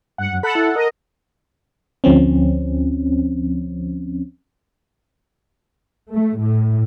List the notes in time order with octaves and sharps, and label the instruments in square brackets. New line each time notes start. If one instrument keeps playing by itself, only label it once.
[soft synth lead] G2 [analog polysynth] F#5
[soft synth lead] F#2
[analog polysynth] A4 F#5 [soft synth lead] B5
[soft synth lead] E4
[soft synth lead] A#4 [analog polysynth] D#5
[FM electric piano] D2 F3 C4 C#4
[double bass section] A3
A2